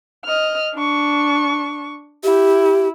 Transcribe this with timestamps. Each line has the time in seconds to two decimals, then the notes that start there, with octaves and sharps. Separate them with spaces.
0.25 D#5 F6
0.74 D4 C#6
2.24 E4 G4